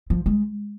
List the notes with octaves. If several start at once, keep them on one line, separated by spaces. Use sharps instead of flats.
F3
G#3